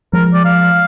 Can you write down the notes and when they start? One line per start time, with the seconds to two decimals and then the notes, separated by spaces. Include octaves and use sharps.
0.13 F3 G#3 A#4
0.34 D5
0.45 F5